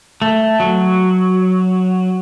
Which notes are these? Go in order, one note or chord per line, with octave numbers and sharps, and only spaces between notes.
A3
F#3